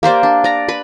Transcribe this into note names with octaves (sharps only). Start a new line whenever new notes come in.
A#3 G4 C5 D5
D4
D5 A#5
B4 B5